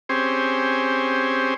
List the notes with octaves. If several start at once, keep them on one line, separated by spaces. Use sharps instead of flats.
C4 C#4 G4 G#4 C5